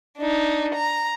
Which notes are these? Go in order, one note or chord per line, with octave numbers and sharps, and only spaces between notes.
D4 D#4
A#5